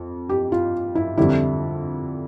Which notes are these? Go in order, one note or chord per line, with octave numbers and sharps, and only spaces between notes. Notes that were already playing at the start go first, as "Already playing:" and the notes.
Already playing: F2
G4
F4
E4
F2 D3 G3 E4